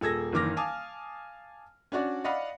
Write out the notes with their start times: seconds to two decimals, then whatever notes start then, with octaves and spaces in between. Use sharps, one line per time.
0.01 D#1 G#4 A4 E6 G#6 A#6
0.32 F#1 D#3 E3 D6 F6 A#6
0.57 F5 G#5 A5 D6 D#6
1.92 C#4 D4 F#4 D5
2.24 D5 D#5 F5 F#5 B5